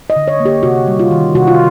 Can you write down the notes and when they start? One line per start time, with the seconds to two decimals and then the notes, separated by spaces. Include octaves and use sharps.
0.10 D#5
0.16 D3
0.28 C#5
0.40 A#3
0.45 G4
0.63 C3 F#4
0.87 G3
0.99 F4
1.11 D#3
1.35 C3 F#4
1.48 F4